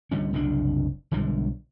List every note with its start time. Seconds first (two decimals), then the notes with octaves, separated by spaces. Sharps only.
0.11 D3 G3 C#4
0.33 F#1 C2 C3 D4
1.11 B1 D3 G3 G#3